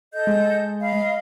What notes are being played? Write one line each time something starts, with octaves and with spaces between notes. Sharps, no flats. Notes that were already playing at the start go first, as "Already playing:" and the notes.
A4 D#5 G6
G#3
D#5 F5 B5